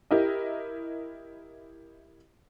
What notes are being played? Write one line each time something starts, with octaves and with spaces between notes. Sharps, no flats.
E4 G4 A#4 D#5